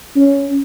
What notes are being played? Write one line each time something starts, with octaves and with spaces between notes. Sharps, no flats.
C#4